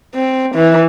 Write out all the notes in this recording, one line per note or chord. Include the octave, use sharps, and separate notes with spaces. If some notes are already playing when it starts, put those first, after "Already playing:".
C4
E3